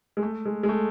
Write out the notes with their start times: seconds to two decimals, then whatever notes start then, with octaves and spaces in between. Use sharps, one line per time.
0.17 G#3
0.22 A3
0.45 G#3
0.63 G#3
0.69 A3